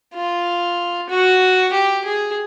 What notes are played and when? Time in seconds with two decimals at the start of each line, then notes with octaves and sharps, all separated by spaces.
0.15 F4
1.10 F#4
1.73 G4
2.05 G#4